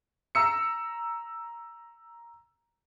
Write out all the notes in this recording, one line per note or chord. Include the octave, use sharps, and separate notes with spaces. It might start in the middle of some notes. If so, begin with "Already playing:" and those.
A#5 E6 C#7